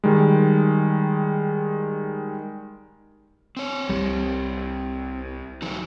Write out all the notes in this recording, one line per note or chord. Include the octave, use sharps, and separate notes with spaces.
D#3 G3 G#3
C4 C#5
C2 G3
E3 F#3 D#4